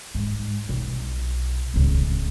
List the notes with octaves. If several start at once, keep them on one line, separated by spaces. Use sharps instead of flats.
G#2
B1
D1 C#2